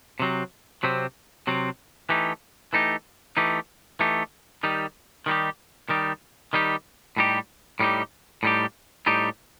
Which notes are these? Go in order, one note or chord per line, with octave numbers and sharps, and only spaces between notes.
C3 F#3 C4
C3 F#3 C4
C3 F#3 C4
E3 A3 D#4 G4
E3 A3 D#4 G4
E3 A3 D#4 G4
E3 A3 D#4 G4
D#3 G3 D#4 G4
D#3 G3 D#4 G4
D#3 G3 D#4 G4
D#3 G3 D#4 G4
A2 G3 D#4 G4
A2 G3 D#4 G4
A2 G3 D#4 G4
A2 G3 D#4 G4